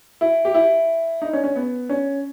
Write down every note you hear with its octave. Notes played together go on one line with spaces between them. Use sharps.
E4
G4
E4
D#4
C#4
C#4
B3
C#4